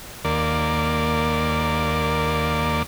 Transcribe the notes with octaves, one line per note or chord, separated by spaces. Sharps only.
D#2 A#3 D5